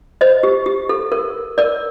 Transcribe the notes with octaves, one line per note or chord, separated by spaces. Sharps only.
C5 D#5
G4
G4
A4
A#4
A#4 D5